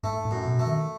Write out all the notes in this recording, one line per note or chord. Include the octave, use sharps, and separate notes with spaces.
G#2 A3
A2
F#2
B2
A3
D#3